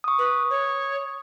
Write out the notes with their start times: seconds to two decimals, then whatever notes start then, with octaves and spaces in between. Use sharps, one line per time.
0.04 C#6 D#6
0.19 B4
0.50 C#5